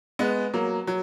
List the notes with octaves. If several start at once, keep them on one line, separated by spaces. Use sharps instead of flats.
G#3 B3
F#3 A#3
F#3